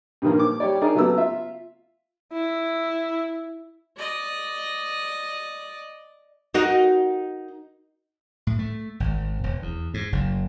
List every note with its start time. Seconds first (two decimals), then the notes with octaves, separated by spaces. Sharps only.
0.22 G2 A#2 D#3 F3 A#3
0.39 D6
0.60 G3 G4 C#5 D5
0.81 D4 D#4 G#4 A#4 D5
0.94 C#3 F#3 A3 B3 F#4 E6
1.17 F4 E5
2.33 E4
3.97 D5 D#5
6.54 D#4 F#4 A#4
8.47 A2
8.59 A3
9.00 G#1
9.43 E1
9.62 E2
9.94 G#2
10.12 F#1